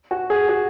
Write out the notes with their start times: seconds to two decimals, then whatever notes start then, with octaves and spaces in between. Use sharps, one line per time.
0.11 F#4
0.30 G#4
0.49 F#4